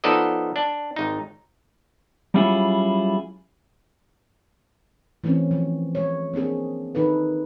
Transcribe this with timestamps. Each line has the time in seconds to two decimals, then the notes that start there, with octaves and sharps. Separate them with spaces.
0.04 F3 B3 D#4 A4 D5 D#5
0.56 D4
0.96 G#1 D#4
2.34 F#3 G3 C#4 E4 F4 G#4
5.24 E3 A3 C4 C#4
5.51 F3
5.95 G#3 C#5
6.34 A#3 C4 D4 G#4
6.95 D#3 D#4 A4 B4